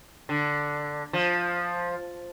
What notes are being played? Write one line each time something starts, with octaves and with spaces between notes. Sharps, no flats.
D3
F3